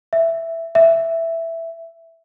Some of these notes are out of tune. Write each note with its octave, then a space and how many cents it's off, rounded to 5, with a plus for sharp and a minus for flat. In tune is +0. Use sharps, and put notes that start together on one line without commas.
E5 +5
E5 +5